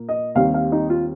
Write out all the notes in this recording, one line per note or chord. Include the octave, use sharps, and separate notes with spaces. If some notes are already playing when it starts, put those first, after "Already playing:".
Already playing: A#2 A#3
D#5
D#2 D#3 G3 C4 F5
F5
D#4
F4